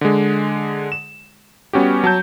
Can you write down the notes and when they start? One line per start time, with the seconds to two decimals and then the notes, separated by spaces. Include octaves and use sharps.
0.01 D3 G#3
0.92 E7
1.73 G3 B3 C#4 F#4 G4
2.04 F#3 A5 G6